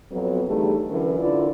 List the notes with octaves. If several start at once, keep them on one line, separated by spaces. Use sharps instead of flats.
F2 F#3 B3
E2 D3 G3 A3 D#4 G#4
F#2 D3 E3
D3 E4 F4 D5